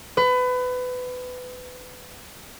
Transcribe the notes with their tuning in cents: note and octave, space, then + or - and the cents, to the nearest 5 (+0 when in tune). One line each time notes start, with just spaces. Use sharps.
B4 +25